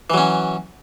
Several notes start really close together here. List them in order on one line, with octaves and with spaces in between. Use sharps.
E3 F#3 C#4